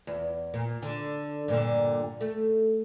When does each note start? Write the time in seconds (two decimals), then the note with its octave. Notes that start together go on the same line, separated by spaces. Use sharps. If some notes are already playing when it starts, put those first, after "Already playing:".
0.07 E2
0.54 A#2
0.82 D3 D4
1.48 G2 A#2 D3
2.21 A3